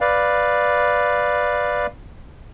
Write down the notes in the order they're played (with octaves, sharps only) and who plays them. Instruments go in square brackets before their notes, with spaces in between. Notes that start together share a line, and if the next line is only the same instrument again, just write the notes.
[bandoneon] B4 D5 F5